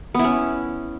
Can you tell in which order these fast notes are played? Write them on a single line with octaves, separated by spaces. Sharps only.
B3 E4 C#4